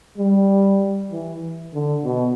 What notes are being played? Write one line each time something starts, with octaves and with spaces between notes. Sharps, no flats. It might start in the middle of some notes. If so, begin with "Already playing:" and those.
G3
E3
D3
B2